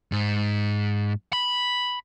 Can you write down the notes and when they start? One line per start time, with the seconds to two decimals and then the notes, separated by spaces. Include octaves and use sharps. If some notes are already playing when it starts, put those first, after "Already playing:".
0.12 G#2
1.33 B5